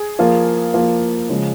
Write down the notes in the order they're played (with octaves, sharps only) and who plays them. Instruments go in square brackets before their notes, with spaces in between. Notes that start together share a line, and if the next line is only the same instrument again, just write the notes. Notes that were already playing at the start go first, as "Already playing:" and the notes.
Already playing: [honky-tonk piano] G#4
[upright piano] F3 A#3 F4
F3 A#3 F4
C#3 F3 G#3